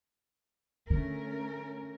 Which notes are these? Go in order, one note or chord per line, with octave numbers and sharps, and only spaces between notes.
D3 A3 C#4 A#4